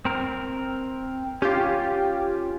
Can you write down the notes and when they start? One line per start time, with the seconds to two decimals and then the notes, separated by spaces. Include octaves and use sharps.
0.05 C4 A#4
1.42 C#4 F4 G4